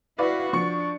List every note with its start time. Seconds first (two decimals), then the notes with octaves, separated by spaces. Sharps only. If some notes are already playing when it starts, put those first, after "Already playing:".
0.18 E4 F#4 B4 D5 F5
0.53 F3 D4 C#6 C#7